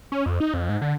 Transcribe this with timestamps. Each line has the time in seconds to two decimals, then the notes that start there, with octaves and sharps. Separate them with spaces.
0.12 C#4
0.26 F2
0.40 D#4
0.54 F2
0.69 G#2
0.81 D3